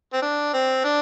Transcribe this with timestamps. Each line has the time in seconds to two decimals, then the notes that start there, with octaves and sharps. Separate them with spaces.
0.13 C4
0.22 D4
0.54 C4
0.84 D4